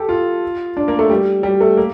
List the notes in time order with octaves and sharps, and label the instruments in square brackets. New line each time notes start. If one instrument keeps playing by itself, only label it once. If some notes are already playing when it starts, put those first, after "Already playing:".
Already playing: [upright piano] G4 A4
F4
D4
A#3
A3
G3
G3
A3
A#3